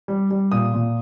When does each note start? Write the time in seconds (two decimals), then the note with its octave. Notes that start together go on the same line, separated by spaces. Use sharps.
0.08 G3
0.31 G3
0.52 A#2 D#6
0.74 A#2